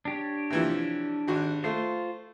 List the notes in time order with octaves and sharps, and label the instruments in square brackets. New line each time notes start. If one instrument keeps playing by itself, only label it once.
[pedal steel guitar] D4 G4 C#5
[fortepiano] C3 E3 F3
G#1 F#4
[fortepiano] A3 [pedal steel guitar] F4 C5